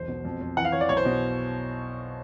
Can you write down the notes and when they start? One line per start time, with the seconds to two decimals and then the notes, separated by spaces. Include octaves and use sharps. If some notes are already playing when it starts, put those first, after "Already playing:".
Already playing: E1 B1 C5
0.08 B2
0.25 F2
0.41 F2
0.57 E3 F#5
0.65 F5
0.72 E3 C#5
0.81 D5
0.89 B1 C#5
0.97 C5
1.05 B2